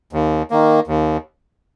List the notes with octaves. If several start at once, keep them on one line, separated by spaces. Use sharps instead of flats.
D#2
D#3 A#3
D#2